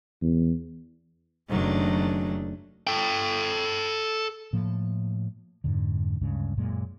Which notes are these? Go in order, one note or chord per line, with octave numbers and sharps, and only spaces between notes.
E2
F#1 D#3 F#3 A3 D4
A4 G5
A2 F3 A#3
F2 G#2 D3
D2 G2 C#3 G#3
F#2 A#2 G#3